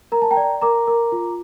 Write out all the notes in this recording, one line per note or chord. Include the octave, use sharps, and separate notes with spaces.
A#4 A#5
A5
G5 A#5
D5
A#4 A#5 D6
A#4
F4